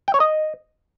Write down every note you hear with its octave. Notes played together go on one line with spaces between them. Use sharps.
G5
C#5
D#5